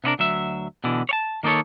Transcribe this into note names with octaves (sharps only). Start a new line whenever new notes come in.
C3 B3 D4 A#4
D2 F#3 E5
B2 D3 E3
C#5 A5
D#3 A#3 D#4 A4 C#5